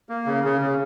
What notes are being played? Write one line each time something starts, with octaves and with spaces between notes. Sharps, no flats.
A#3
C#3
C#3
C#3